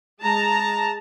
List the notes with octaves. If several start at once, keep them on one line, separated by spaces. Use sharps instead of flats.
G#3 A5 A#5